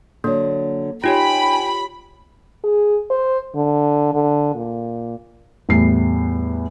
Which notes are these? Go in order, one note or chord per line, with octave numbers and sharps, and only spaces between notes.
D3 F#3 A#3
D#4 F4 G4 C#5 G5 G#5 B5
G#4
C5
D3
D3
A#2
E2 A2 G3 C7